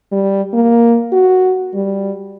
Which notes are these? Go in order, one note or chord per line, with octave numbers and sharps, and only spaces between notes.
G3
A#3
F#4
G3